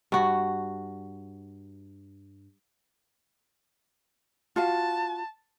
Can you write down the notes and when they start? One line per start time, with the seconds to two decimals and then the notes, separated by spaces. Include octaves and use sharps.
0.12 G2 F#4
4.56 F4 F#4 F5 A5